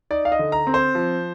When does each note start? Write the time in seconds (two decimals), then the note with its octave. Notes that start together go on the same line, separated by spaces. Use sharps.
0.11 D#4 D5
0.25 F5
0.32 D#5
0.39 D3
0.52 A#5
0.67 C4
0.74 C5
0.95 F3